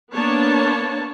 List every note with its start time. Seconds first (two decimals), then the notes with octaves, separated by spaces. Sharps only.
0.14 A#3 B3 D4 C#5 A5